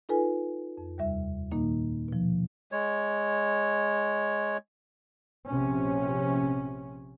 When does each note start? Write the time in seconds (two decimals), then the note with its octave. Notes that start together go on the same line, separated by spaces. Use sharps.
0.09 D#4 F4 A4 B4 G#5
0.78 F2
0.98 D#2 C3 G3 E5
1.52 A#2 D#3 A#3 D#4
2.08 B2 F3
2.72 G#3 C#5
5.49 A#1 C3 C#4